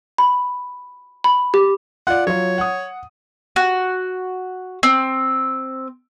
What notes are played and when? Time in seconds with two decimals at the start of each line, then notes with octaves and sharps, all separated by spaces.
0.18 B5
1.24 B5
1.54 G4
2.07 F4 D5 F#5
2.27 F#3 F4 C#5
2.58 F#5 D#6
3.56 F#4
4.83 C4